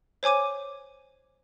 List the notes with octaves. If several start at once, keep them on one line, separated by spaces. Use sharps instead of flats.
C5 C#5 G#5 D6 D#7